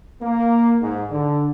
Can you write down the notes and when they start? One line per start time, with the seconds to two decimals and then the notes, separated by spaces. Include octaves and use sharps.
0.20 A#3
0.80 G#2
1.10 D3